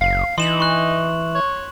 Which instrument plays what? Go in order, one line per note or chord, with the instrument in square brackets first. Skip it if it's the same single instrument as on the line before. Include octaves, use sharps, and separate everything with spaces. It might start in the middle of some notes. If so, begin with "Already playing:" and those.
[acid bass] F#1 [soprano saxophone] F5
[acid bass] E3 [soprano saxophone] D#4 [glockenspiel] C6 E7 F#7
[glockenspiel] C#6 F#6
[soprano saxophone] C#5